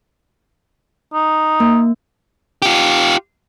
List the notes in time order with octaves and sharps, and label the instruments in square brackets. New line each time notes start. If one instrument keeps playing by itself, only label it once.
[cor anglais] D#4
[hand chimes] A#3
[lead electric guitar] F4 G4